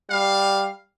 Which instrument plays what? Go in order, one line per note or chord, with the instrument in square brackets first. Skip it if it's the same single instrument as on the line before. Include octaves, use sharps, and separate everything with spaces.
[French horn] G3 [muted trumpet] F5